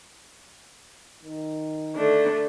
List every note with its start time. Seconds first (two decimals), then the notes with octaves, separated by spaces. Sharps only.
1.23 D#3
1.96 D3 A3 D4